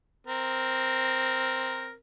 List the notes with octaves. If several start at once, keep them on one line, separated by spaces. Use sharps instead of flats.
C4 A#4